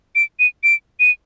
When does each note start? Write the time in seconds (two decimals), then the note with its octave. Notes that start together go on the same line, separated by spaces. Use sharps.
0.15 D7
0.40 D#7
0.64 D7
1.00 D#7